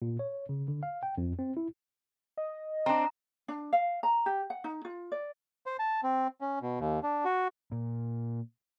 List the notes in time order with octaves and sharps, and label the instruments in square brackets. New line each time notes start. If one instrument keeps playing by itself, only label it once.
[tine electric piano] A#2
C#5
C#3
D3
F5
G5
F2
C4
E4
[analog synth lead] D#5
[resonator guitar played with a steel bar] C4 D4 [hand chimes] A#5
[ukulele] D4
F5
A#5
G4
F#5
D#4
F4
D5
[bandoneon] C5
A5
C4
C#4
B2
D#2
D4
F#4
[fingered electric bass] A#2